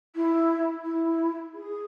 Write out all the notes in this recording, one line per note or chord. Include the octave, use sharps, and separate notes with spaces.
E4
E4
G#4